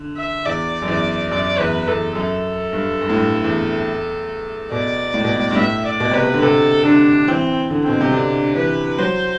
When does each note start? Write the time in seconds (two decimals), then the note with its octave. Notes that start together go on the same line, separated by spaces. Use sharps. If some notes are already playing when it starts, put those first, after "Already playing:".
Already playing: D3
0.17 E5
0.46 E2 D5
0.82 F#2
0.88 E2 D5
1.31 F#2 D5
1.59 E2 B4
1.87 E2 A4
2.15 F#2 A4
2.73 G2
3.01 G2
3.09 A2
3.17 G2
3.44 E2
4.71 B2 D5
5.14 A2
5.24 B2
5.35 A2
5.51 G2
5.57 A2 E5
5.85 D5
6.00 B2
6.11 C3 B4
6.23 B2
6.34 D3
6.42 C3 A4
6.85 D3 D4
7.28 E3 C4
7.70 D3
7.84 B2 C4
8.01 C3
8.12 D3 D4
8.55 E3 B4
8.98 F#3 C5